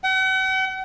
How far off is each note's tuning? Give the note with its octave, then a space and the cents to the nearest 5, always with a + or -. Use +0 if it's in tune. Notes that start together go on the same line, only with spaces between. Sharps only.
F#5 +40